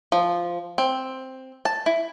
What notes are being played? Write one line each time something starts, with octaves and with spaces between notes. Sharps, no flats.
F3
C4
A5
E4